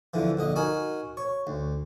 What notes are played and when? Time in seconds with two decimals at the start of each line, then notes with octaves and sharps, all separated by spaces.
0.14 E2 D3 E3 F3
0.37 A#1 D3 D#5
0.56 D#4 F#4 A#4 G#5
1.17 C#5
1.47 D2